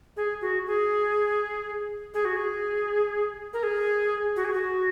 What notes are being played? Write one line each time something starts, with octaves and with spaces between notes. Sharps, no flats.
G#4
F#4
G#4
G#4
F#4
G#4
A#4
G#4
F#4
G#4
F#4